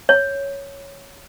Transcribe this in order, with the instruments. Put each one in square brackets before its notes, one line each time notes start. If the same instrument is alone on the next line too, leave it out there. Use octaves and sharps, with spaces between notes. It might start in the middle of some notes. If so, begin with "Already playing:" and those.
[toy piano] C#5